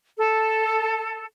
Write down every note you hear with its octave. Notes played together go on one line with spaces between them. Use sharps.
A4